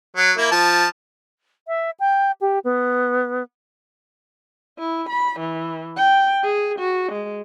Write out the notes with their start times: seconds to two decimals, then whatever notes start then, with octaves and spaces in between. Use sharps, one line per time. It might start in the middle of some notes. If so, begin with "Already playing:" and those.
0.17 F#3
0.37 A#3 E4
0.52 F3 A5
1.68 E5
2.00 G5
2.41 G4
2.64 B3
4.79 E4
5.09 B5
5.40 E3
5.96 G5
6.44 G#4
6.79 F#4
7.12 G#3